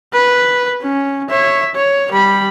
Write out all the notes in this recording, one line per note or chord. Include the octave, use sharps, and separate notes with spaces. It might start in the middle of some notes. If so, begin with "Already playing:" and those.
B4
C#4
C#5 E5
C#5
G3 B5